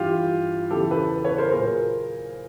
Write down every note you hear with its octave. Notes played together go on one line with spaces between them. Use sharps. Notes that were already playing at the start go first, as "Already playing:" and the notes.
Already playing: G2 E3 F4 G4
E2 C#3 E3 G4 A4
A4 B4
B4 C#5
A#4 C5
A#2 F#3 G#4 A#4